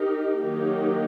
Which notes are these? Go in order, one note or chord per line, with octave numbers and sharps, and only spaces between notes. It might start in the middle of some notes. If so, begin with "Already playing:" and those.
Already playing: D#4 G4 A#4
D#3 F#3 A#3 D#4 G4